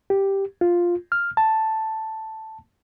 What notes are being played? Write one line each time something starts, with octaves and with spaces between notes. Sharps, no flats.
G4
F4
F6
A5